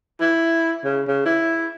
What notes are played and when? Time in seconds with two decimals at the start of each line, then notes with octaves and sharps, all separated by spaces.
0.21 E4
0.85 C#3
1.07 C#3
1.26 E4